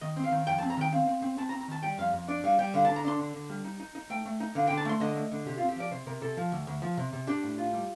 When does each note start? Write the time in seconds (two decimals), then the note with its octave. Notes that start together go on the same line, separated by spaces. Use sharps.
0.01 D#3 D#5
0.17 C4
0.24 F5
0.32 D#3
0.47 F2 G5
0.58 C4 A5
0.70 A#5
0.77 D#3 G5
0.92 C4 F5
1.07 C4
1.22 C4
1.37 C4 A5
1.49 A#5
1.53 C4
1.61 A#5
1.68 D#3 A5
1.83 G3 G5
1.98 F2 F5
2.13 F2
2.28 D4 D5
2.44 G3 F5
2.59 G3 G5
2.74 D3 F5
2.85 D3 A5
2.96 A#5
3.05 D4 C6
3.19 D3
3.34 D3
3.50 G3
3.65 D#4
3.80 D#4
3.95 D#4
4.10 A3 G5
4.25 A3
4.40 D#4
4.55 D3 F5
4.67 D3 G5
4.77 A5
4.85 A3 C6
5.00 D3 D#5
5.15 A3
5.32 D3
5.46 C3 G4
5.58 C4 F4
5.69 G4
5.76 F3 D5
5.91 C3 C5
6.06 C3 A#4
6.21 C3 A4
6.37 F3
6.52 D2
6.67 D2
6.82 F3
6.97 C3
7.13 C3
7.27 D4 G4
7.43 A2
7.58 F4
7.73 G3